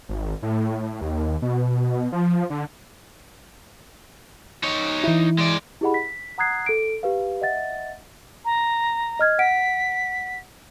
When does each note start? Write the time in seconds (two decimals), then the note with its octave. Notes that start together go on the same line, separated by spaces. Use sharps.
0.09 G#1
0.43 A2
1.01 D#2
1.42 B2
2.12 F3
2.50 D3
4.63 D#4 C#5
5.04 E3 E4
5.38 G#3 D5
5.81 E4 G4 G#4 D#5 F#5 B5
5.94 B6
6.38 F#5 A#5 D#6 F#6 G#6 C7
6.66 A4 D7
7.03 G4 B4 F5
7.41 D#5 E5 F#5 A6
8.45 A#5
9.19 D#5 F6 G#6
9.39 F#5 B6 D7